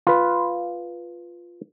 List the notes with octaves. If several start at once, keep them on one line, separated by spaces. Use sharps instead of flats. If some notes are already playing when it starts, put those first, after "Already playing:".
F4 B4